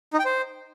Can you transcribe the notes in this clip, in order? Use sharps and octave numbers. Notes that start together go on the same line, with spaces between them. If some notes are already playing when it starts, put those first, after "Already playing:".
D#4
G5
C5